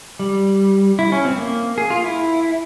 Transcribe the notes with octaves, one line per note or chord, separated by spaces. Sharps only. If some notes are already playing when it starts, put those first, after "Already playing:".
G3
E4
C#4
C4
A#3
G#4
F4
E4